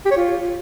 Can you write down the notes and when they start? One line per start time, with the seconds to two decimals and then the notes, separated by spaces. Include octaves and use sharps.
0.05 G4
0.11 C#5
0.17 F4